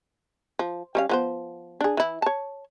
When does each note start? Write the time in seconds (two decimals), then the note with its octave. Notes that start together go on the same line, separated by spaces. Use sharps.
0.59 F3
0.95 G3 C#4 F5
1.09 F3 B3 C5
1.81 D4 G#4
1.97 E3 E4
2.22 C#5 A5